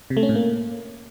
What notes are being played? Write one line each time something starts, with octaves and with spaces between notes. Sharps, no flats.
C3
A3
C#4
A2
A#3